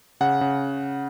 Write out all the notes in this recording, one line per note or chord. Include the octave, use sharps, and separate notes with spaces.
C#3 F#5
C#3